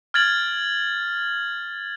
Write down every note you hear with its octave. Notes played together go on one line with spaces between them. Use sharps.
F6 G#6 A6 F#7